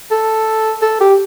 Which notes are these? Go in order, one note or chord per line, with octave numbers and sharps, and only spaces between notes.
A4
A4
G4